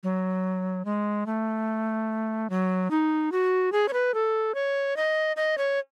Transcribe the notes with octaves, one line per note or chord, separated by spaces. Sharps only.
F#3
G#3
A3
F#3
D#4
F#4
G#4
C#5
B4
A4
C#5
D#5
D#5
C#5